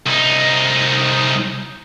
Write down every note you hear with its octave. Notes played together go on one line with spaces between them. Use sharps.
C2 D#4